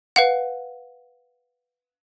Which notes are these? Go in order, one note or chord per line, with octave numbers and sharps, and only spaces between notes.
B4 F5 F#5